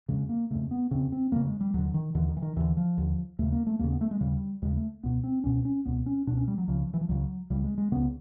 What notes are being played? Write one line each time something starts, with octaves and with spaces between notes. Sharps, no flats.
F2 C#3 G#3
A#3
F2 C#3 A3
B3
F2 C#3 C4
C4
F2 C#3 A#3
G#3
G3
D#2 D3 F#3
D#3
D#2 D3 E3
D#3
E3
D#3
D#2 D3 E3
F3
D#2 D3
D#2 C#3 A3
A#3
A3
D#2 C#3 A#3
B3
A3
G#3
D#2 C#3 G3
D#2 C#3 G#3
A3
C#2 B2 B3
C4
C#2 B2 C#4
C#4
C#2 B2 B3
C#4
C#2 B2 D4
C#4
G3
F#3
C#2 C#3 F3
E3
F3
C#2 C#3 F#3
C#2 C#3 G3
G#3
G#3
C#2 C#3 B3